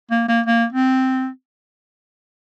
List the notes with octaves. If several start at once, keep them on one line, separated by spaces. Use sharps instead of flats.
A#3
A#3
A#3
C4